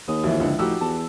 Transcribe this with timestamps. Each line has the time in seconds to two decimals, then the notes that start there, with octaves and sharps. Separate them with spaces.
0.08 D#2 D#6
0.23 D2 E3 F3 E4
0.40 C#2 D3
0.59 A2 F3 D#4 F#4 G4 E6
0.81 E2 A5